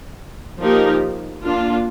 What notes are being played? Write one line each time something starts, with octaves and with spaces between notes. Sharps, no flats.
F3 A#3 D#4 G4 A#4
A#3 D4 F4